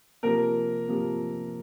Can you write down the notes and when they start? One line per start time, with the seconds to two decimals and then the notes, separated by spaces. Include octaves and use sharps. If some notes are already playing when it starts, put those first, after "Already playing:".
0.23 C3 F3 A#3 A#4
0.88 C3 F3 A#3